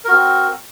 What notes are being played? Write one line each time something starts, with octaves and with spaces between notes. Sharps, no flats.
C4 F#4 A#4